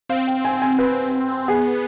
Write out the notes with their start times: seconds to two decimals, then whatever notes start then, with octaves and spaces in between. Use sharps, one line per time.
0.09 C4 F5
0.27 G5
0.45 G#5
0.62 G#5
0.79 B4
1.48 B3 G#4